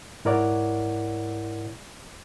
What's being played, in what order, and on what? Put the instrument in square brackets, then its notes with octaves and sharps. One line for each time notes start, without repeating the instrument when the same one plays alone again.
[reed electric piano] G#2 E4 A#4 C#5 D5 F#5